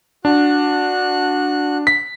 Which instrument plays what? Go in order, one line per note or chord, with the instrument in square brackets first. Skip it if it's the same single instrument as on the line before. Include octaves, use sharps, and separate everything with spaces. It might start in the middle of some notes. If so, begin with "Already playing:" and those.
[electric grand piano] D4 [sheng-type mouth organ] F#4 F#6
[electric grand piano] B6